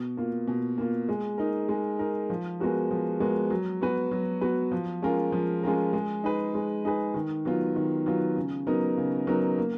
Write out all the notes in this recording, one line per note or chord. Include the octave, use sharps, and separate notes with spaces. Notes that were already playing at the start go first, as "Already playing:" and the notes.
Already playing: B2
A#3 F4
B2
A#3 F4
G#3
D#4 A#4
G#3
D#4 A#4
F3
G#3 B3 F#4 A#4
F3
G#3 B3 F#4 A#4
F#3
B3 F#4 B4
F#3
B3 F#4 B4
F3
G#3 C#4 F4 A#4
F3
G#3 C#4 F4 A#4
G#3
D#4 G#4 B4
G#3
D#4 G#4 B4
D#3
F#3 B3 F4
D#3
F#3 B3 F4
C#3
F#3 B3 D#4 A#4
C#3
F#3 B3 D#4 A#4
A#3